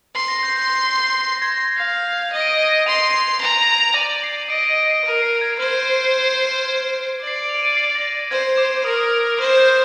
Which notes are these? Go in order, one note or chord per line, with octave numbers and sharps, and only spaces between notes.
C6 C7
A#6
G6
G6
C7
A#6
G#6
A#6
F5 C7
D#5 D#7
D7
D#7
C6 F7
A#5
D5 D#7
C7
C7
D#5 D7
D#7
D7
C7
A#4 D7
C7
G#6
C5 F6
D7
C7
D5
C7
D7
F7
D7
D#7
C7
A#6
C5 G#6
D6
A#4 D#6
D#6
F6
F6
C5 F6
G6